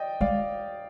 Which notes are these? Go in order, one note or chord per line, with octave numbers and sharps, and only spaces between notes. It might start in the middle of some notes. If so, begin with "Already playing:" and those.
Already playing: D5 D#5 G5
G#3 D5 F5